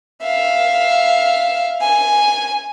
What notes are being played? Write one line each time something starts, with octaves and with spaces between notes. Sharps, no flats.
E5 F5
G#5